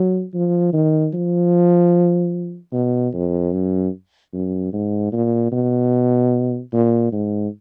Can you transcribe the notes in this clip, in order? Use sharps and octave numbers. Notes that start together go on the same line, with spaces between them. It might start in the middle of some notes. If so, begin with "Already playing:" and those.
Already playing: F#3
F3
D#3
F3
B2
F2
F#2
F#2
G#2
A#2
B2
A#2
G#2